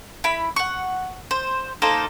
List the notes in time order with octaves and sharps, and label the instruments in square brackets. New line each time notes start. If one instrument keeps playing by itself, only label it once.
[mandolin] E4 B5
F#5 C#6
C5
A#3 D#4 A4 C5